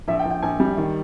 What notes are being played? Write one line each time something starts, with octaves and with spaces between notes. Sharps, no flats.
A#1 E5
G5
A#1
G5
A#1 G#5
G3
D#3